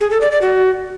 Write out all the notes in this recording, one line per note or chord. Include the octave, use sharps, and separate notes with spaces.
G#4
A4
D5
D5
F#4